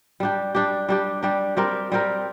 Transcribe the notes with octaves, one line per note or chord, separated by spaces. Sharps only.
G3 D4 G4
G3 D4 G4
G3 D4 G4
G3 D4 G4
G3 C4 G4 A#4
G3 C4 G4 A#4